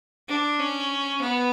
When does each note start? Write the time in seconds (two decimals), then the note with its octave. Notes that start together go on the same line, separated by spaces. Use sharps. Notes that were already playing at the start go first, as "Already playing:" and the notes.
0.28 D4
0.59 C#4
1.21 B3